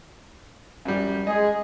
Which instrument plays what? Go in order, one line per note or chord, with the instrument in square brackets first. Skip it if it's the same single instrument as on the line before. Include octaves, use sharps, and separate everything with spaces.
[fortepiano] F#2 F3 G3
[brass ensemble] G#3 G#4 [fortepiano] D#5